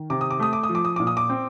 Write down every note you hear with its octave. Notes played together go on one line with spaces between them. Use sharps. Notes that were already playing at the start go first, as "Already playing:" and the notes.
Already playing: D#3
C3 D6
D#6
D6
A3 D#6
D6
D#6
F3
D6
D#6
A#2 D6
D#6
D6
C4